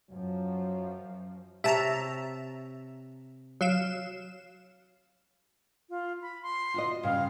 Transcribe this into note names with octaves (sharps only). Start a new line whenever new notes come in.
F#2 F3 F#3
C3 C#5 E5 A5 A#5
F#3 F5 E7
F4
B5
C6
F4 F#4 D#5
G2 C#3 F5